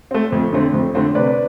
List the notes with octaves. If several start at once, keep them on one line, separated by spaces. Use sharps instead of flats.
A3 C4
F2
D3 A3 C4
F2
D3 A3 C4
C3 B4 D5